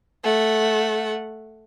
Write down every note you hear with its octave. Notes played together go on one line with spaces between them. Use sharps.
A3 F#5